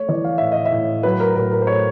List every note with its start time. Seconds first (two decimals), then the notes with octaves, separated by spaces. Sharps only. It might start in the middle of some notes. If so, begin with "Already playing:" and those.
Already playing: A3 C#5
0.09 E3 D5
0.24 F5
0.38 A2 E5
0.52 D#5
0.65 E5
0.72 A2
1.03 F#3 B4
1.20 A#4
1.36 A2 A#4
1.52 A#4
1.62 C5
1.67 A3 C#5